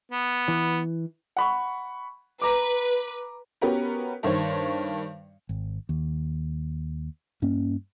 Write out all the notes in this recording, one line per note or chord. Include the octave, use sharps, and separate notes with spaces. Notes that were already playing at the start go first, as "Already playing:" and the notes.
B3
E3
F#5 B5 C#6
B4 A#5 D6
B3 C#4 F#4 G4 A#4 B4
G2 D#3 C5 C#5
G#1
D#2
G2 A#3 C#4